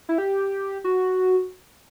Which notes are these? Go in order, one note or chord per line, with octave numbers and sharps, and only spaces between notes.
E4
G4
F#4